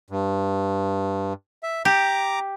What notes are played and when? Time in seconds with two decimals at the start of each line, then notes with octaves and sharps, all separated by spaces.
0.10 G2
1.63 E5
1.85 G4 A#5 D6